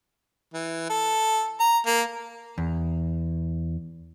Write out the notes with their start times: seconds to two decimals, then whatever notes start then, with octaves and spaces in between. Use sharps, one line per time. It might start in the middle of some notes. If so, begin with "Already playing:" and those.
0.54 E3
0.89 A4
1.60 A#5
1.86 A#3
2.58 E2